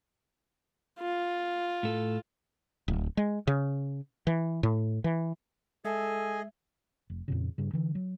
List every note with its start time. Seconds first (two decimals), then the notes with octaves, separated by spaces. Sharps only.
0.99 F4
1.83 A2 A4
2.88 D1
3.17 G#3
3.47 C#3
4.27 E3
4.63 A2
5.04 E3
5.85 G#3 G#4 A4 D#5 E5 G#5
7.10 F1
7.28 F2 A#2 C#3
7.58 G2 C#3
7.73 D3 E3
7.95 F#3